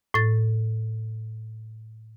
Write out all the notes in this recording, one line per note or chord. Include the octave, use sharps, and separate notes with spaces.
A2 A6